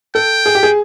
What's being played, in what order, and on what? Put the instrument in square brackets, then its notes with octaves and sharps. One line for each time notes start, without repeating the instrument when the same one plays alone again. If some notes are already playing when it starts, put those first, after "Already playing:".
[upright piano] A4 [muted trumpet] G5
[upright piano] G#4
G4
G#4